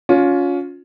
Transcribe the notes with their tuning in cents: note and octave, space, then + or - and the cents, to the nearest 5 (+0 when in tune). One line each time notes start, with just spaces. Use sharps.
C#4 +25 F4 +25